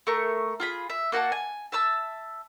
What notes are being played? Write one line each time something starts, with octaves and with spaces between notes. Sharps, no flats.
A3 A#4 C#6
F4 G#4 B5
E5
A#3 F#4 F#5 A5
G#5
E5 A5 E6